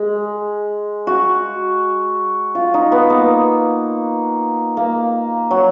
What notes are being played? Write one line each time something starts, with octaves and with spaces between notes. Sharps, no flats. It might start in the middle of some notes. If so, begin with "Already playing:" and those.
Already playing: G#3
F#4
F4
D#4
B3
A#3
A#3
F#3